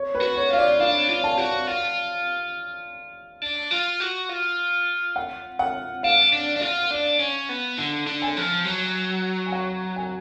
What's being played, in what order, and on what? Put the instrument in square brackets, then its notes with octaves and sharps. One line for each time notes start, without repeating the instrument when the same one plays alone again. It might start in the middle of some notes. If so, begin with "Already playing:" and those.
Already playing: [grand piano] C#5
B4
[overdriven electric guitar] F#4
[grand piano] C#5
[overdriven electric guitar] F4 [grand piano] F5
[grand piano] D5
[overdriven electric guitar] D4 [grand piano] F5
[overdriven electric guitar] F4
[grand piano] A5
[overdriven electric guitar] F#4
F4
D4
F4
F#4
F4
[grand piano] F#5
F#5
[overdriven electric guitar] D4 [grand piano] F5
[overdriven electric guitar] D4
D4
F4
D4
C#4
B3
D3
D3
[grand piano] G#5
[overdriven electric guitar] F3
F#3
[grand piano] G#5
F#5
G#5